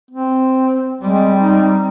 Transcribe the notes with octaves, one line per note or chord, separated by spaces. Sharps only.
C4
G3 G#3 C4
D#4